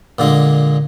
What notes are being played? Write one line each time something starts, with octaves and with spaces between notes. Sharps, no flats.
A#2 D3 G#3